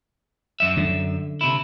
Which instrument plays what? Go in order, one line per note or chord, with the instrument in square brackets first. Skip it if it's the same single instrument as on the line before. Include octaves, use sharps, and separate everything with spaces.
[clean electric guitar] F#2 E5
[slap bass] D3
[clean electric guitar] C3 E4